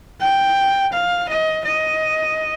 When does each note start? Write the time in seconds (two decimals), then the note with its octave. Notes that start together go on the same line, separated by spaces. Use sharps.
0.21 G5
0.93 F5
1.29 D#5
1.65 D#5